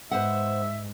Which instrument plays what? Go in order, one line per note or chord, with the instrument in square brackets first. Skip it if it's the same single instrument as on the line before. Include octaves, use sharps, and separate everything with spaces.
[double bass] G#2 [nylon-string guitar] B4 C5 F#5 [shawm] E5